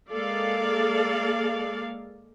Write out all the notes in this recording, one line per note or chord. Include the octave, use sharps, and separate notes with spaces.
G#3 A#3 A4 D5 F5